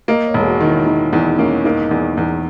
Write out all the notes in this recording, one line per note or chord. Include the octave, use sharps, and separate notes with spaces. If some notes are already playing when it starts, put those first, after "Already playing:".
A#3 D#5
C#5
E1
G#4
F#4
D#3
E4
D#3 D#4
E2 D#4
A#3 C#4
A#3 D#4
E2
E2